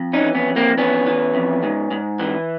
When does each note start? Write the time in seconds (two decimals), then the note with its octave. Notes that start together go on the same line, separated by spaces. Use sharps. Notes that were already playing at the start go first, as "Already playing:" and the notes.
Already playing: F2
0.13 C#4 D#4
0.21 E3
0.35 B3 C#4
0.49 F2
0.56 A#3 C4
0.78 E3 B3 C#4
1.06 E3
1.35 F2
1.63 G#2
1.91 G#2
2.20 E3